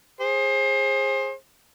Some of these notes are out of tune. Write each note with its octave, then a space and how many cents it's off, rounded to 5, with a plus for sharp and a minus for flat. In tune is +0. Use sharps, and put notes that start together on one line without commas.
G#4 -10 C5 +30